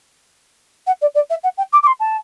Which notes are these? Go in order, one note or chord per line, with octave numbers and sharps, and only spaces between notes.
F#5
D5
D5
E5
F#5
G5
D6
D6
C6
A5